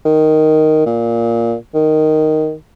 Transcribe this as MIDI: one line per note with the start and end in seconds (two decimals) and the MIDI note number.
0.05 0.84 51
0.86 1.54 46
1.74 2.54 51